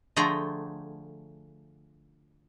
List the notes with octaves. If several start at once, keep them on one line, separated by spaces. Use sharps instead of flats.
D3 F3 A3 G#4 G5 A#5